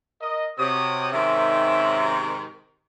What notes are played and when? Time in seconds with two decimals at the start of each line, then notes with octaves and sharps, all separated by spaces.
0.21 A#4 D#5
0.59 C3 F#4 C#5 D#6
1.12 G#2 C3 D#3 C#4 E5